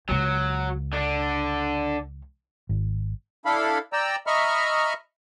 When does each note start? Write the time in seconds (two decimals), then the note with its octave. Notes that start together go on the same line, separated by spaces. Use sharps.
0.09 C#2 C#3 F#3
0.93 D3 D4
2.69 G#1
3.46 D4 E4 A4 F5 B5
3.93 D5 G5 A#5 E6
4.27 D#5 E5 A#5 B5 C#6 F6